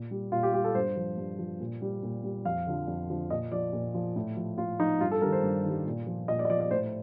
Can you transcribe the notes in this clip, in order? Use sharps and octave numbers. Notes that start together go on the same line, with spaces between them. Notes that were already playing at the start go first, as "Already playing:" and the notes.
Already playing: A#2
G3
A#2 F4
G4
G3 G4
A4
G2 C5
F3
G2
F3
A#2
G3
A#2
G3
F2 F5
D3 F3
F2
D3 F3
A#2 D#5
F3 D5
A#2
F3
A2
F3
A2 F4
F3 D#4
G2 F4
A4
D#3 G3 A#4
C5
G2
D#3 G3
A#2
F3
A#2 D#5
D5
D#5
F3 D5
D5
A2 C5